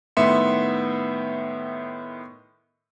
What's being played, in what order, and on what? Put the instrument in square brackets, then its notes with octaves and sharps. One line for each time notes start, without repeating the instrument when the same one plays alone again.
[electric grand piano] A2 D#3 B3 E5 C6 C#7